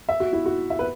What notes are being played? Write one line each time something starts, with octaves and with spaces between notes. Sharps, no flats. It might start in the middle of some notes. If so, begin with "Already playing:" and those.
E5
F#4
E4
F#4
E5
B4